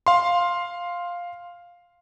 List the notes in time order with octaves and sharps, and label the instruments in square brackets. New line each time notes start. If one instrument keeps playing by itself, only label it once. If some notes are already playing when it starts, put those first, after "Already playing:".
[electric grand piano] F5 C6